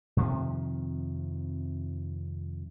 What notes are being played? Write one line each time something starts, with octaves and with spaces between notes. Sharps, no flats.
F2 C3 D#3 F3